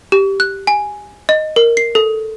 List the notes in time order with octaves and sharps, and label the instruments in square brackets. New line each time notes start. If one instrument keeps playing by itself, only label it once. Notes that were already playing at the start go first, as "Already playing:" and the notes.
[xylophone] G4
F#6
G#5
D#5
A#4
C7
A4